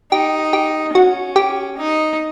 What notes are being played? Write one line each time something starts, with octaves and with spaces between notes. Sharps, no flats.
D#4 G4
G4
C#4 F#4
G4
D#4